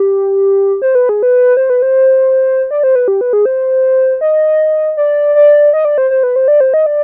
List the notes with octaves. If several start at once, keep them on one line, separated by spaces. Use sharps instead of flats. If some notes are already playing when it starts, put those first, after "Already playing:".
Already playing: G4
C5
B4
G#4
B4
C5
B4
C5
D5
C5
B4
G4
B4
G#4
C5
D#5
D5
D5
D#5
D5
C5
C5
B4
C5
D5
C5
D#5
D5